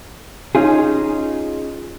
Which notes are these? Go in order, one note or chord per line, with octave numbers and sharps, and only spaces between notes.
C#4 D#4 F4 G#4